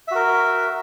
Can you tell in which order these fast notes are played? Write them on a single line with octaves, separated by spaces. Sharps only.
E5 F#4 A#4